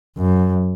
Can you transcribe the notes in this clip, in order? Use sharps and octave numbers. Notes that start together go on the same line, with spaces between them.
F#2